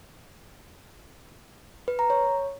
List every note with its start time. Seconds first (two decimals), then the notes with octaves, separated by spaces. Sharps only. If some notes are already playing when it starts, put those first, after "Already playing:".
1.88 B4
1.99 A#5
2.10 C#5